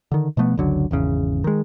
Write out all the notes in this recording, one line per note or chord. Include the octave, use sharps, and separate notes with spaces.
D3 D#3
B2 F3 A3 B3
F#1 C#2 D3 F#3
G#1 E2 C#3
D#3 G#3